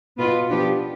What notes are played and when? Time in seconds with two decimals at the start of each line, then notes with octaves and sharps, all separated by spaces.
0.18 B2 B3 F4 B4
0.49 F3 B3 D4 G4